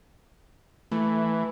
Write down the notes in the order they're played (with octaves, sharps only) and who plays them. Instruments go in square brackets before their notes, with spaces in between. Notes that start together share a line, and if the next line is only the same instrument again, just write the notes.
[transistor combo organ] E3 [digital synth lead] A3